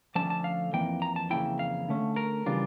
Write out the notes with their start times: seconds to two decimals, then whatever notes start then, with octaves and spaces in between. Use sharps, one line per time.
0.15 D3 F3 A3 C#4 A5
0.30 A5
0.44 F5
0.73 F2 E3 A#3 G5
1.02 A#5
1.16 A5
1.30 F2 C#3 E3 A#3 E4 G5
1.59 F5
1.89 D3 A3 C#4
2.16 A#4
2.46 C#3 E3 G3 D4 F4